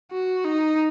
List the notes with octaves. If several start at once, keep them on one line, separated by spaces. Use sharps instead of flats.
F#4
D#4